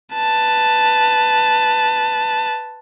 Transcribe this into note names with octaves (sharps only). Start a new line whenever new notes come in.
B4 A5